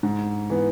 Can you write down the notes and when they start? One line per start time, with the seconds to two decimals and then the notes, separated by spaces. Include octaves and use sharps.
0.03 G#2
0.50 E3 B3